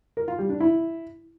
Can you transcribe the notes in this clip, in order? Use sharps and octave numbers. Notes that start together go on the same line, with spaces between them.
A#4
F4
G3
D4
E4